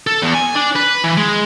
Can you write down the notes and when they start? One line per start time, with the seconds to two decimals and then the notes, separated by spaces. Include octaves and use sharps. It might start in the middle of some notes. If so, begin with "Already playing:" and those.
0.07 A4
0.22 E2
0.34 G#5
0.55 D4
0.75 B4
1.04 E3
1.17 G#3